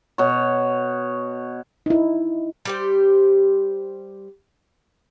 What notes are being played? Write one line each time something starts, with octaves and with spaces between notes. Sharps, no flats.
B2 C#5
D#4 E4
G3 G4 C5